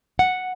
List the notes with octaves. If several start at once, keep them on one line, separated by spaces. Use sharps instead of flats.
F#5